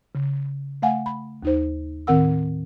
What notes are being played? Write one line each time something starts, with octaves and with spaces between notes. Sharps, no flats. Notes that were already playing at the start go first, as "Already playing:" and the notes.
C#3
A3 F5 F#5 G#5
B5
D#2 D#4 C5
A2 D#3 C4 A#4 F#5 E6